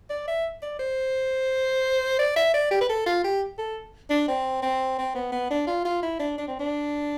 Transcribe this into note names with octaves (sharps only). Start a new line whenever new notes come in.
D5
E5
D5
C5
D5
E5
D5
G4
B4
A4
F4
G4
A4
D4
C4
C4
C4
B3
B3
D4
F4
F4
E4
D4
D4
C4
D4